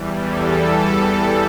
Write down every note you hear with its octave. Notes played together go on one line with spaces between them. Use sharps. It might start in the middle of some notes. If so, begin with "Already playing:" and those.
Already playing: E2 E3 G3
A4